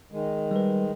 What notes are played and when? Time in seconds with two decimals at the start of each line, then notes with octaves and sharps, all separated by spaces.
0.12 D#3 G#3
0.51 G3 B4